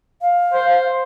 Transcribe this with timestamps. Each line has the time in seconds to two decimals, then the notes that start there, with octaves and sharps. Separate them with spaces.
0.21 F5
0.53 C5